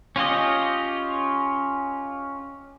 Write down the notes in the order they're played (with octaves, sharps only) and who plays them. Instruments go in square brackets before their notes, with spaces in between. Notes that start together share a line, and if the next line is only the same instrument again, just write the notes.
[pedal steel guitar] C#4 F4 G4 D#5